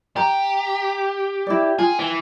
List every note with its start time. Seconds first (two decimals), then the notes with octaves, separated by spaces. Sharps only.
0.16 G4 A#5
1.47 E4 D5
1.79 F4 G#4 G5
1.99 E3